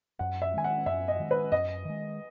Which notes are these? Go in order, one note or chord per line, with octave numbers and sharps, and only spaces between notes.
F#2 F#5
E5
D#3 G#3 G#5
F#5
F#2 E5
D#5
D#3 G#3
B4
F#2 D#5
D#3 G#3